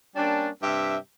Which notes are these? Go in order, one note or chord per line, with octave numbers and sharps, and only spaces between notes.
G3 A#3 C#4 D4
G2 C3 G4 E5